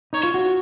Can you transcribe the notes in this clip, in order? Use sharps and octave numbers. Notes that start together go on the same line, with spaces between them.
D#4 C#5
F4
F#4